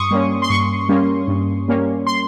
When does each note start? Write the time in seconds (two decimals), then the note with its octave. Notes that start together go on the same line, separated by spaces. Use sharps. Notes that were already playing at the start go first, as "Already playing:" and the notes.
Already playing: G2 C6 C#6 D#6
0.11 G3 A#3 C#4
0.42 C6
0.50 G2 C#6
0.89 G3 A#3 C#4
1.28 G2
1.68 G3 A#3 C#4
2.07 C6